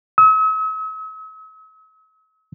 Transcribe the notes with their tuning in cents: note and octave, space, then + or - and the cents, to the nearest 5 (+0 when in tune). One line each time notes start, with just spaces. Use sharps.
E6 -45